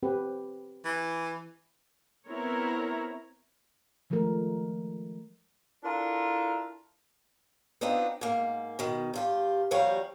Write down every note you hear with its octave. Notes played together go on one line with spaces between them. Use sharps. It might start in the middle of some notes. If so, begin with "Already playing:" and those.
C4 G4 B4
E3
B3 C4 E4 A#4 C#5 A#5
D#3 F3 G#3 A3 A#4
D4 E4 F4 A4 A#4
B3 C4 D4 D#4 F4
G#2 A#3
B2 D#3
G2 F4 G4
D#2 F3 G3 F#4 C#5 F5